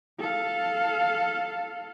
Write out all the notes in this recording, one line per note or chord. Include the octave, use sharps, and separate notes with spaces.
A4 F5